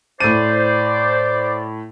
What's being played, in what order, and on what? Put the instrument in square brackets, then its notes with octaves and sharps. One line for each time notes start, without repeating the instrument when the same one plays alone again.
[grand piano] A2 D#7 [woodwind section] C5 D5